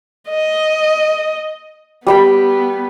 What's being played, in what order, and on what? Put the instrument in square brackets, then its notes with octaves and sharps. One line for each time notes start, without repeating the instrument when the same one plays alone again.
[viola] D#5
[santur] G3 G5 B5 [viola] B3